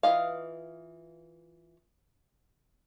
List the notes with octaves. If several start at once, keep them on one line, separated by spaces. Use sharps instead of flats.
E3 F4 D#5 F5